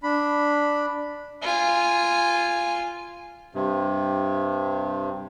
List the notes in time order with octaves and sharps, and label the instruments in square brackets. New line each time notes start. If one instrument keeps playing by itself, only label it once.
[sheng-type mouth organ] D4 B5
[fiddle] F4 G#5
[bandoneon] G2 C3